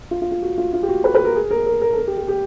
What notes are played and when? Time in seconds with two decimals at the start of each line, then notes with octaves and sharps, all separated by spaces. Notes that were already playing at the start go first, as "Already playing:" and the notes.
0.11 F4
0.22 F4
0.32 F4
0.42 F#4
0.58 F4
0.73 F4
0.83 G4
0.89 F#4
1.04 B4
1.15 B4
1.25 A#4
1.35 G#4
1.51 A#4
1.66 A#4
1.81 A#4
1.93 A4
1.97 A#4
2.07 G4
2.17 G4
2.28 G4